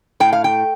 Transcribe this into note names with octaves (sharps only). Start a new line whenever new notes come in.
A2 G5
F5
G5